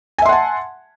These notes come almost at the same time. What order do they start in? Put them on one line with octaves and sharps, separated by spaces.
G#5 E5 C6 F#5 A5